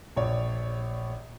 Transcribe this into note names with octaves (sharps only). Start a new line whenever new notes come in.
A#1 C#5 D5